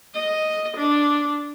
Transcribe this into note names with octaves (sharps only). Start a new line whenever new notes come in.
D#5
D4